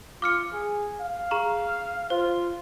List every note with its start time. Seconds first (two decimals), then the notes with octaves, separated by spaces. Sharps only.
0.22 F4 D6 F6 C#7
0.53 G#4
1.01 F5
1.31 G#4 A#5 C#6
2.10 F4 C5